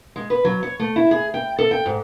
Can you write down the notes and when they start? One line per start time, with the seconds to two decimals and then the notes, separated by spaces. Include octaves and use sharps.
0.16 G#3
0.30 B4
0.45 F#3
0.63 C#5
0.79 A3
0.96 E4
1.11 G#4
1.34 G5
1.58 A4
1.71 G5
1.86 G#2